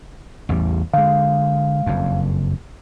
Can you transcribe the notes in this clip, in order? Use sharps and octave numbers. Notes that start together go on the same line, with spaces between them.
A1 E2 G3
D3 G#3 F5
F#1 F2